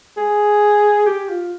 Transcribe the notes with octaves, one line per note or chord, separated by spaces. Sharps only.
G#4
G4
F4